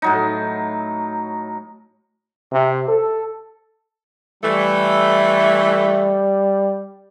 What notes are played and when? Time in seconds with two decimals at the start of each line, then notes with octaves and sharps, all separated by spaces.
0.02 A2 F#3 D#4
2.51 C3
2.87 A4
4.43 E3 G3 A3